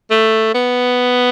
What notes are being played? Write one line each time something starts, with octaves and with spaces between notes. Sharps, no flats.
A3
B3